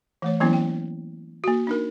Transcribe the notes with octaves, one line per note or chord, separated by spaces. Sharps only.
E3 A3 C#5
E3 F#3 A#3 B3 C#4 E4
G5
A#3 F#4
D4 D#4 A#4